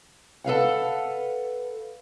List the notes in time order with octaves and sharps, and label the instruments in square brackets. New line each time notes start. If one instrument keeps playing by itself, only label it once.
[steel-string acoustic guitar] A4 B4 F5 F#5